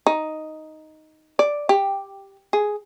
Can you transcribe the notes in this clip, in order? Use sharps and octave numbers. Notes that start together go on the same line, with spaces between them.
D#4
D5
G4
G#4